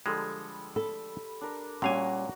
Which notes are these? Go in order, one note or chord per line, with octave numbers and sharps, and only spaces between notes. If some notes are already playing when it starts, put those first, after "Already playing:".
D3 F3 G3 G#3 A4
A4 B5
D4 A#4
A#2 G3 C#4 F#4 F5 G#5